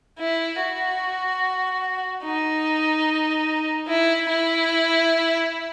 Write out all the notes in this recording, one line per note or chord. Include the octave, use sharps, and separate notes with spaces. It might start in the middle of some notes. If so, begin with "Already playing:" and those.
E4
F#4
D#4
E4
E4